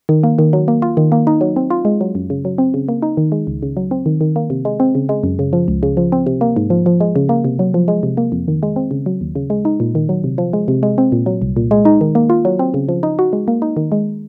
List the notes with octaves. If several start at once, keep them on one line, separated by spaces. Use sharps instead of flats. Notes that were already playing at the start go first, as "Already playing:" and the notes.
D#3
A#3
D#3
F#3
A#3
F4
D#3
A#3
D#4
F#3
C4
F4
G#3
F#3
F#2
C#3
F#3
C4
C#3
A#3
D#4
D#3
G#3
C#2
C#3
F#3
C4
D#3
D#3
A#3
C3
G#3
C4
C#3
G#3
F#2
C#3
F3
C#2
C#3
F3
C4
C3
A#3
G#2
F3
F3
G#3
C#3
A#3
C3
F#3
F3
G#3
C3
A#3
F2
D#3
G#3
C4
C#3
F#3
D#2
C#3
G#3
D#4
A#2
D#3
F#3
C3
F3
G#3
C3
G#3
C4
A#2
F#3
C2
A#2
G#3
D#4
D#3
A#3
F4
F#3
C4
C#3
F3
D#4
F#4
G#3
A#3
D#4
D#3
G#3